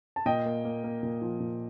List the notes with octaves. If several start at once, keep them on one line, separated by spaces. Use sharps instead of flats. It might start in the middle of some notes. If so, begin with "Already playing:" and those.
A5
A#2 D#5 G5
A#3
A#3
A#3
A#2
F3
A#2